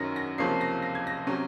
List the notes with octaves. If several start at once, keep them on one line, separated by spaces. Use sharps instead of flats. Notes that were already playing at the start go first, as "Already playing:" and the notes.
Already playing: F#2 D#3 F#3 C#4 A#6
A#6
C#2 C3 F3 A#3 C#4 C7
A#6
A#6
G#6
A#6
C3 F#3 C#4